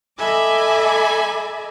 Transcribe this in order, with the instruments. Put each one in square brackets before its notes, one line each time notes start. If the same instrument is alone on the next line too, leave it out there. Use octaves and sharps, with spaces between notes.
[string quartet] A4 D#5 E5 G#5 B5 D6